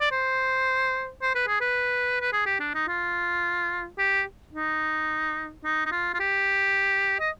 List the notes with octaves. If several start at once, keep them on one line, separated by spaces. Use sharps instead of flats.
D5
C5
C5
B4
G#4
B4
B4
G#4
G4
D4
D#4
F4
G4
D#4
D#4
D#4
F4
F4
G4
D#5